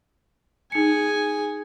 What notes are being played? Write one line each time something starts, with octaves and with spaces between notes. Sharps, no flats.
D#4 G#4 G#5 C#7